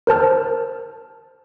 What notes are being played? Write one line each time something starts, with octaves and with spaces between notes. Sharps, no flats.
A#4 C5 A5 F6